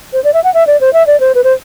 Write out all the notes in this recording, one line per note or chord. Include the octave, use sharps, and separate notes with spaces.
C5
D5
E5
F#5
E5
D5
C5
E5
D5
C5
B4
C5